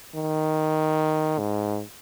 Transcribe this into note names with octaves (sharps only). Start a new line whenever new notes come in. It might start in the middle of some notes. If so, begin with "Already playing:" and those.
D#3
G#2